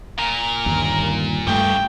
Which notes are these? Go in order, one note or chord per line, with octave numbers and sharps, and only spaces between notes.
A#2 A#4
G1 D#2
G2 C#3 G3 A3 G5